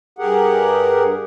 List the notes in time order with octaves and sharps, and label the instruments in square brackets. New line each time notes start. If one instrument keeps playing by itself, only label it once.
[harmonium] G2 G4 G#4 A#4 F#5